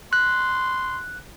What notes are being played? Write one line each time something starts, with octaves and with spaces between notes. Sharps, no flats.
C6 F#6